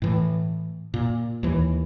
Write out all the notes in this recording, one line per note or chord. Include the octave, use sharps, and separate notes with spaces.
A2 E3
A#2
D#2 E3